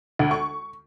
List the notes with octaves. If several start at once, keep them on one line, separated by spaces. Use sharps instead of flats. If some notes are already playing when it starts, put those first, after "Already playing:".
D2
C#6